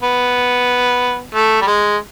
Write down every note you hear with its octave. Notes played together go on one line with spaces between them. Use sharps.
B3
A3
G3
G#3